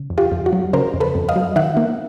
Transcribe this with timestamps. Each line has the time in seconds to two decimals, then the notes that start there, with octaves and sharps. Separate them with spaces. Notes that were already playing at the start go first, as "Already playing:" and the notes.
Already playing: C#3
0.10 F2
0.18 F4 G4
0.32 F2
0.46 F#4
0.53 F#3
0.73 C#3 A#4 C5
0.93 F2
1.00 A4 B4
1.15 F2
1.29 D#5 F5
1.36 F#3
1.56 D#3 E5 F#5
1.77 A#3